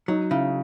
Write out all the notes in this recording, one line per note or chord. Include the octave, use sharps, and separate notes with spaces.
F#3 D#4
C#3 E4